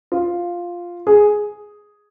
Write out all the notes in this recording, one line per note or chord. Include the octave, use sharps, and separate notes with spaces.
F4
G#4